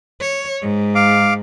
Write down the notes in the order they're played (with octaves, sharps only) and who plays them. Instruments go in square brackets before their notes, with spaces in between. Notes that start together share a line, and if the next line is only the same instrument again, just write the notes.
[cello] C#5
G#2
[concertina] F5 D6